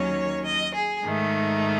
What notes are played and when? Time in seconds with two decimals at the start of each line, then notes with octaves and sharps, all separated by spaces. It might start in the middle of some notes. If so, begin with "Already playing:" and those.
Already playing: D#2 D#3 F#3 C#4 C#5
0.46 D#5
0.75 G#4
1.03 G#2 D#3 A3